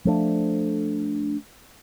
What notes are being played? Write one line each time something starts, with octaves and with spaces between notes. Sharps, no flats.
F3 A3 D4